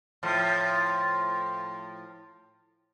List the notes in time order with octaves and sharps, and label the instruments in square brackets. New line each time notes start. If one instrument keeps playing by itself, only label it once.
[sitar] A2 F3